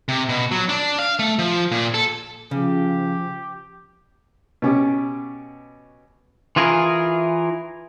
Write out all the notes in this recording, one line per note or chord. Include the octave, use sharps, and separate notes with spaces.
C3
B2
F#3
D4
F5
A3
F3
A#2
A4
C#3 F3 G4
B2 C#4 G4
E3 F4 G#4 A#4